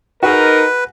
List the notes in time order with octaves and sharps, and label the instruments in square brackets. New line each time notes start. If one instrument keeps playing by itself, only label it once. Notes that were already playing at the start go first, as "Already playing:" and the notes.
[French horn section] D#4 A#4 [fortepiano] F#4 G#4 [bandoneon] B4